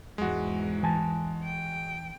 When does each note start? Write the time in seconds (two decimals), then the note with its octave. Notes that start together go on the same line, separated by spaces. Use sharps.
0.18 E2 G#2 G#3 F#4
0.83 E3 G#5 A5
1.43 G5